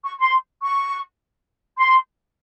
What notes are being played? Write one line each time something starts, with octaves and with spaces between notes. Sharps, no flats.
C#6
C6
C#6
C6